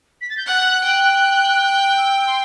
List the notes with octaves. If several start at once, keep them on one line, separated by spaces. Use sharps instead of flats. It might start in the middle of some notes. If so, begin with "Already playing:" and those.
B6
A6
G6
F#5 F#6
G5
F#6
E6
E6
C6